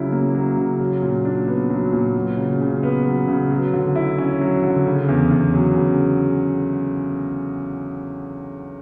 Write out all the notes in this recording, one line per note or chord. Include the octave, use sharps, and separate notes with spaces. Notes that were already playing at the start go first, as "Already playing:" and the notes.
Already playing: C#3 F#3 E4
A#3
F#3
C#3
F#3
A#2
D4
B3
F#3
A#2
F#3
C#3
C#3
B3
F#3
C#3
F#3
D3
E4
C#4
F#3
D3
C#3
E2
E2
F#3
C#3